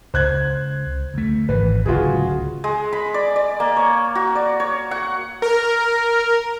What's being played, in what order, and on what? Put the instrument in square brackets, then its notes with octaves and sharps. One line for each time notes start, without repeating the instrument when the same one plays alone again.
[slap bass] C#2 [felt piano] C5 F#6 G#6
[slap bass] D2 A3
[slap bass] G#1 E3 [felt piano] B4
[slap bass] D1 C#2 [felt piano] F4 F#4 G#4
[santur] G#3
B5
D5
D5
A#3
C#5
F#4
D5
C#5
F#5
[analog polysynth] A#4